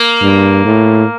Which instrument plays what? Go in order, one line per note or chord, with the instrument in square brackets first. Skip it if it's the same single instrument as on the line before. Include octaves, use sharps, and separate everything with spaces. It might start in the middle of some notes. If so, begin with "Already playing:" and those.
Already playing: [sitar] A#3
[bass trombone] G2
A2